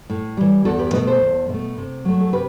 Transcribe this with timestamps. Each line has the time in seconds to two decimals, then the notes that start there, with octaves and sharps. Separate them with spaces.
0.10 A2
0.37 E3 G3
0.65 E2 F#4 A4
0.79 G4 B4
0.93 B2 A3 B4 D#5
1.07 A4 C5
1.21 E2
1.49 B2 A3
1.78 C3
2.05 F#3 A3
2.21 A4
2.33 C3 G4 B4